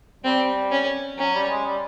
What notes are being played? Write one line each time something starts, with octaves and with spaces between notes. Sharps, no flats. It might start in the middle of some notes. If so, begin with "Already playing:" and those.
G3 C4
C#4
F#3 C#4
G3
G#3
G3